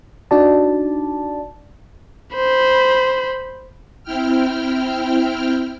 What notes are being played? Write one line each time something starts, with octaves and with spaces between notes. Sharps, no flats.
D4 D#4 F#4 D5 A5
C5 B5
C4 E4 G5 F6